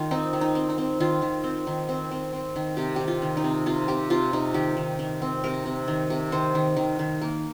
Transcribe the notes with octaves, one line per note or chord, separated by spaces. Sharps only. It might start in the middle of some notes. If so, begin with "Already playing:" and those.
Already playing: D#3 F4
C4 D#4
D#3
D#4
C4
D#4
C4
D#3 F4
D#3
C4
D#3
C4
C4
C4
D#3
C3 G4
D#3 G4
F4
D#3
D#4
C3
C3 F4
C3 G4
C3 F4
C3 D#4
D#3 G4
D#3
D#3
C4
C3 A#4
C3
D#3
C3
D#3 C5
D#3
D#3
D#3
A#3